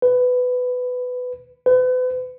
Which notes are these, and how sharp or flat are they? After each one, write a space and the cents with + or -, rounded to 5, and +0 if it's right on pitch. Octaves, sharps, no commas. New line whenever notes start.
B4 +15
B4 +40